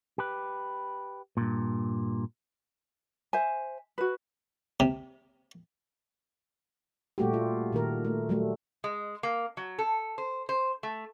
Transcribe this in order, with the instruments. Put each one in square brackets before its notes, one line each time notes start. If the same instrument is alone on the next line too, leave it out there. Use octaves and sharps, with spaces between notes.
[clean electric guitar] G4 B4
G2 A#2
[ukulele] C5 E5 G#5
F#4 B4
[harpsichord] C3
[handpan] A#2 G3 A3 F#4 G4
F4
A#2 D#3 A#4
A3
F#3 G3 A3
[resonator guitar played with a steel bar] G#3
A#3
F#3
A4
C5
C5
A3